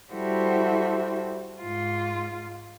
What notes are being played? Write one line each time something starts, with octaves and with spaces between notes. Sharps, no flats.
G3 E4 F#4 A4 C5 E5
G#2 F4